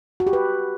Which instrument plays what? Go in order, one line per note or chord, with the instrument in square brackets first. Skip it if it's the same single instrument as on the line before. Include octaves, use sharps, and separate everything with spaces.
[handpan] F#4
G4
B4